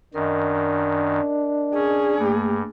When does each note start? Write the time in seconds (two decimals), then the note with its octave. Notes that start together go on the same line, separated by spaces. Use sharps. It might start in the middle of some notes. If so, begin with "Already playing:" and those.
0.14 F#2 D#3 D4 A#4 D#5
1.75 C#4 G#4
2.18 G2 A3 A#3